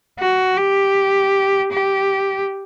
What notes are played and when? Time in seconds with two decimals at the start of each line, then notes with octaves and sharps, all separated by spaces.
0.20 F#4
0.58 G4
1.72 G4